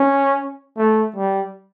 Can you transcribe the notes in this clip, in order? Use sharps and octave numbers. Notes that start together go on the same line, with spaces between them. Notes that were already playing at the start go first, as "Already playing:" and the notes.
Already playing: C#4
A3
G3